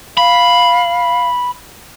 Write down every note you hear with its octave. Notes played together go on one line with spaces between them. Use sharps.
F5 B5